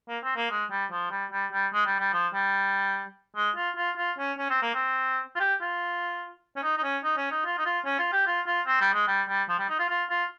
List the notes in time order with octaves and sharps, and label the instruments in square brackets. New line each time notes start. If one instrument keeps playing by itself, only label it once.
[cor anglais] A#3
C4
A#3
G#3
G3
F3
G3
G3
G3
G#3
G3
G3
F3
G3
G#3
F4
F4
F4
C#4
C#4
C4
A#3
C4
F4
G4
F4
C#4
D#4
D#4
C#4
D#4
C#4
D#4
F4
D#4
F4
C#4
F4
G4
F4
F4
C4
G3
G#3
G3
G3
F3
G3
D#4
F4
F4
F4